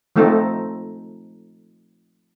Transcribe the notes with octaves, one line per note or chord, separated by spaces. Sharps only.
F3 A3 C4 D#4 A4